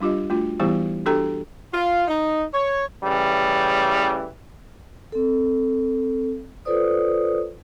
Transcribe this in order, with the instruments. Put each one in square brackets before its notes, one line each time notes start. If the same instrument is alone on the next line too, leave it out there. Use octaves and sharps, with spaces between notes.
[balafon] G3 D4 F4 G4 D#5
A3 D4 F4 F#4
E3 G3 B3 E4 G4 C5
D4 F#4 G4 A4 G5 A#5
[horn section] F4
D#4
C#5
[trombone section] A1 C#3 E3 G3
[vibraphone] C4 A4
F4 A4 B4 C5 D5 D#6